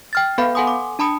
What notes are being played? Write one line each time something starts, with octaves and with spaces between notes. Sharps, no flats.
G5 F6 A6
B3 A4 B4 F5 B5 G6
A4 F#5 G#5 C6 D#6
D6
D4 A5 B5 D#6 C#7